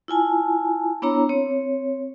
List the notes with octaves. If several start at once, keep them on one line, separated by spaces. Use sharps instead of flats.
E4 F4 G#5 A5
B3 D4 E4 C#5 A#5
C4 C#5